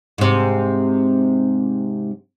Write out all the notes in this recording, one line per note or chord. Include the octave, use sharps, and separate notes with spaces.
G#2 C3